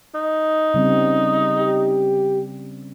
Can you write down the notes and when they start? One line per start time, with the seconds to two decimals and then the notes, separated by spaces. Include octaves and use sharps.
0.15 D#4
0.74 C#3 G3 C4
1.57 G4